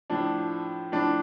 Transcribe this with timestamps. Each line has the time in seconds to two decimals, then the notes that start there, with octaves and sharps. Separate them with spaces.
0.10 A2 F3 D4
0.92 A2 F3 D4